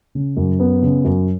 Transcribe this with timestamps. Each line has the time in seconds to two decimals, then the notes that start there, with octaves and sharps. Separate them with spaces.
0.15 C#3
0.37 F#2
0.60 B3
0.82 C#3
1.05 F#2